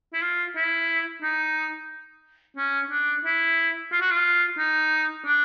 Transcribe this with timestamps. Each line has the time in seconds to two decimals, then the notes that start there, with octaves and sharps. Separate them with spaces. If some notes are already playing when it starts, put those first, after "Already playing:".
0.13 E4
0.22 F4
0.56 E4
1.22 D#4
2.57 C#4
2.91 D4
3.25 E4
3.92 F4
4.01 F#4
4.11 F4
4.58 D#4
5.26 D4